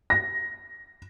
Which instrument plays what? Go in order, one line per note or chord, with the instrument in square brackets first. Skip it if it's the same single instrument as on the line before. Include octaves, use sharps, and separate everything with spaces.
[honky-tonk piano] A#6